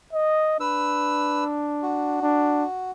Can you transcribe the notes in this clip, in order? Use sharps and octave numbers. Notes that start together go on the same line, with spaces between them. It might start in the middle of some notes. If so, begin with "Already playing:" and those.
D#5
D4 B4 E6
F#4
D4